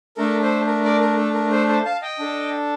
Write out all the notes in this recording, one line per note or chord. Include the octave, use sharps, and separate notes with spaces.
A3 D4 A4 A#4
A4 C5
A#4
A#4 D5
A#4
A4
A#4
A4 C5
A4 C5
F5 A5
D#5 G5
D4 A4